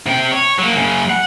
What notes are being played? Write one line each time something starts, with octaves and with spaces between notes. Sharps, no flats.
C3 G5
C#5
F#3 A#3
F#2 C#3
F#5